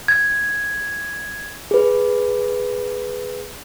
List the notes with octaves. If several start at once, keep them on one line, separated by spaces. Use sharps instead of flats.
G#6
G#4 B4